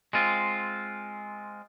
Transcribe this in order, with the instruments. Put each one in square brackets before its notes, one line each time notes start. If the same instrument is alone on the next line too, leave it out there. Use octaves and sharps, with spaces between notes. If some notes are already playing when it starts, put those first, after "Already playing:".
[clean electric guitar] G#3 C4 F4